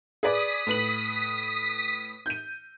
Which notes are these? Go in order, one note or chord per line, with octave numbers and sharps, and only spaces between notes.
G#4 B4 D5 D#6 B6
A2 B4 F#7
G6 D#7